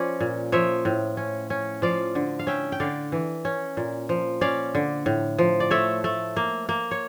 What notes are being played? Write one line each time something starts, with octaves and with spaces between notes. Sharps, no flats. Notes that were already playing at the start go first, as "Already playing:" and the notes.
Already playing: F3 C#4 D5
A#2
F3 C#5 E5
A2
C#4
C#4
F3 D5 F5
D3
F5
C#4 E5 G5
G5
D3 D5 F5
E3
C#4
A#2
F3
C#4 D5 F5
D3
A2
F3
D5
A3 C#5 E5
A3
A#3
A#3
C#5